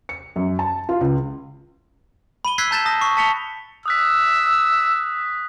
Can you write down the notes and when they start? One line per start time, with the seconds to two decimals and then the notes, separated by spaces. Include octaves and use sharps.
0.09 C#7
0.36 F#2
0.59 A5
0.89 F4
1.01 C#2
2.45 B5 D#7 G7
2.58 E6 F#6 G#6 B6 C7
2.71 A5 A#5 G6 A6 B6 E7
2.85 A5 D#6 A#6
3.01 C#6 C7
3.17 A5 B6 C#7 F7 G7
3.86 D#6 E6 F#6 B6